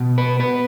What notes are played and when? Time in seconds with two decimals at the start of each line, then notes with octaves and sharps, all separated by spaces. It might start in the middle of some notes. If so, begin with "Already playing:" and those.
Already playing: B2
0.18 B4
0.39 B3 B4